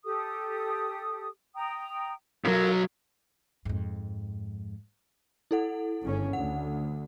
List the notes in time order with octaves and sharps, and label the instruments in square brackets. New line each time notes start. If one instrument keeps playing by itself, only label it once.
[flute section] G4 A4 D#6
G5 A#5 D#6
[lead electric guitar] B1 F#3 [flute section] F4 A4 A#4
[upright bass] F2 G#2
[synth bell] E4 A4 F#5
[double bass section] G1 C#3 C#4
[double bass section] D2 [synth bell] F#5